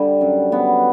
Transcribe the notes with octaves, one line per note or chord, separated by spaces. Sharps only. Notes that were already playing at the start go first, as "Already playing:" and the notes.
Already playing: D3 G3
F#2
B3